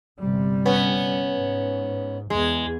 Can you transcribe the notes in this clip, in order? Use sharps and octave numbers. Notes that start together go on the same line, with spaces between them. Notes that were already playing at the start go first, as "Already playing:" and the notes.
G1 C3 G3
B3 C#4
G#2
E2 G#3